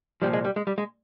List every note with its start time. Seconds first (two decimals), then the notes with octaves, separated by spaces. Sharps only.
0.22 C2 A#2 F3 G3
0.33 G#3
0.45 G3
0.56 G#3
0.67 G3
0.78 G#3